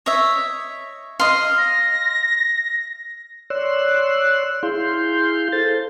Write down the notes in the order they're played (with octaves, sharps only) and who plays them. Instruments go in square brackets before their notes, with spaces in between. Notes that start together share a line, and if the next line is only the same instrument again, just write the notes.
[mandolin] C#5 [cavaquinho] D#5 E5
[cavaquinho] D#5 C6 [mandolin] F5
[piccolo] A#6
[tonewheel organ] C#5 D5 C6 E6 F#6
E4 G#4 F5 C6 G6
A4 C5 A6